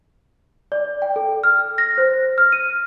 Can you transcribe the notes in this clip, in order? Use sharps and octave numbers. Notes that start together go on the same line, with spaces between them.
D5
G5
A4
F6
A#6
C5
F6
D#7